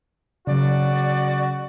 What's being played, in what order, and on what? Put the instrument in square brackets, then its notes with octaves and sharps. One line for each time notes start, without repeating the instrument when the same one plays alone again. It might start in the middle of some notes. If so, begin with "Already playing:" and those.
[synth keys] C#3 F#3 [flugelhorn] F#4 [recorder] D5